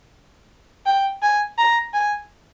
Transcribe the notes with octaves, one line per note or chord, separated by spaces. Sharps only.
G5
G#5
A#5
G#5